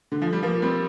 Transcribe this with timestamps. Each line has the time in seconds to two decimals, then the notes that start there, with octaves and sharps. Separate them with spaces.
0.12 D3
0.22 F3
0.33 G3
0.43 F3 A#3
0.62 G3 C4